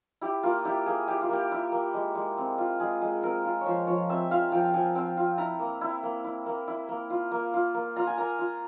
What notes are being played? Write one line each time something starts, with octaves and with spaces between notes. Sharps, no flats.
E4 G4
A#3 F4
E4 G4
A#3 G#4
E4 G4
F4
A#3 G4
E4
A#3
G#3
G#3
C4
F4
G#3 G#4
G#3
C4 A#4
F4
C#5
F3 C5
F3 C#5
C4 E5
F4 F5
F3 G5
F3 G#5
C4 G5
F4
E4 A#5
A#3
E4
A#3
E4
A#3
E4
A#3
F4
A#3
F4
A#3
F4 A#5
G#5
A#3 A#5
F4